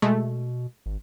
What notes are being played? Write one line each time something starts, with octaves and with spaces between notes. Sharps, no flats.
B2 G#3 A3
G#1